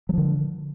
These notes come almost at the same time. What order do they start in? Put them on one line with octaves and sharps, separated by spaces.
F#3 F3 D3